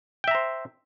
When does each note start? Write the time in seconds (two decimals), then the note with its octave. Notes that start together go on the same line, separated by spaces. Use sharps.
0.24 G5
0.28 E5
0.31 A#5
0.35 C5